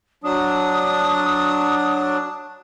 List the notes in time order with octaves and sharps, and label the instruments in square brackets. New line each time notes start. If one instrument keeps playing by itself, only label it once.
[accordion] F#3 D4 [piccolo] D#6